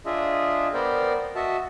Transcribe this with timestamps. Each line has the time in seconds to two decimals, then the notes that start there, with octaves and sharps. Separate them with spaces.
0.06 D4 F4 G#4 D#5 E5
0.74 B3 A#4 C5 D5 G5
1.36 F#4 D#5 E5 A5